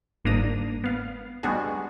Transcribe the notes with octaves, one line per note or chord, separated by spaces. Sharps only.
G1 G#2 A#3 D4 A#5 D#6
B3 F5
G3 G#3 B3 D4 F#4 G#4